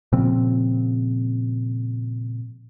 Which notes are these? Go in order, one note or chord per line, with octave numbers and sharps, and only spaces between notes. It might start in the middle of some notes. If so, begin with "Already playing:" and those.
A#2 C#3 F3 C4